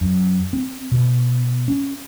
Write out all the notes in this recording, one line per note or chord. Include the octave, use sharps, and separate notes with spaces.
F#2
C4
B2
C#4